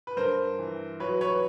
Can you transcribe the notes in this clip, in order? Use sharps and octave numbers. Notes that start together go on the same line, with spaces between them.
B4
G2 A#4 C5
E3
F#3 B4 C#5
B4 C#5